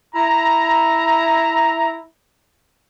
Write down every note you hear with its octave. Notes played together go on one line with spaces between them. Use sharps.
E4 A#5